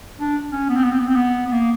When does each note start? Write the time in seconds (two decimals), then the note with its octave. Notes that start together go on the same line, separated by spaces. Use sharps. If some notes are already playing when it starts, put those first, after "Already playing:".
0.19 D4
0.52 C#4
0.69 B3
0.77 C4
0.84 B3
0.92 C4
1.00 B3
1.08 C4
1.15 B3
1.47 B3
1.52 A#3